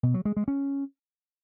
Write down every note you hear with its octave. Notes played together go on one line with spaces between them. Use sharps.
B2
F#3
G#3
G#3
C#4